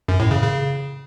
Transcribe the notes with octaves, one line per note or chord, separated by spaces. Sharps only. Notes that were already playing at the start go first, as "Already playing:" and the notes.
F#2
A2
C#3
C#3